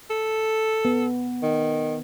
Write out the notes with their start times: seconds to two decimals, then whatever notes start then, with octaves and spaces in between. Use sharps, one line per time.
0.10 A4
0.85 B3
1.43 D#3